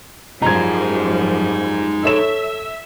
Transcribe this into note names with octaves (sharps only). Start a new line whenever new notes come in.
F#2 F3 G3 D#4 G#4 A#5 G#6
A4 C#5 E5 E6 E7